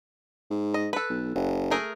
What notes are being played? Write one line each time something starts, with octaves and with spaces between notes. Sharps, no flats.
G#2
D#5
A4 B4
B1
F#1
A3 G#4 A#4